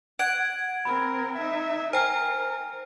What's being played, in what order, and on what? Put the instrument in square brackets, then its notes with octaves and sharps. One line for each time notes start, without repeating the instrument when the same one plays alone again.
[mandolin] F#5 [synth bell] G#6 D7
[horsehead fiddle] C4 A#4 [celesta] B5
[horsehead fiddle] D#4 E5
[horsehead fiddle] A#4 [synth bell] C5 G5 [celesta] G#5 F6